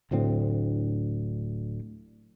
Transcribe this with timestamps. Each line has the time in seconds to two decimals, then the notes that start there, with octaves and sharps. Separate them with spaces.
0.11 D1 D2 A2 C4